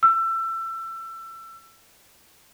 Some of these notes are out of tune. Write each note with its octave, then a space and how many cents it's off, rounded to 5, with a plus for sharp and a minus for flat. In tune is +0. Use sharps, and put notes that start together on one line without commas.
E6 +25